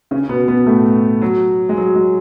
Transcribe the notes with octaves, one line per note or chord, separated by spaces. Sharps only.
C#3 C#4
B2 B3
B2 B3
A2 A3
F#3
G#3
F#3
G#3